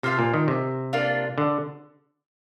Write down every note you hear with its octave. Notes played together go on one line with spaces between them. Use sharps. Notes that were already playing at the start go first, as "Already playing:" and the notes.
C3 F4 C5 F5 A5
A#2
D#3
C3
A#3 D4 F4
D3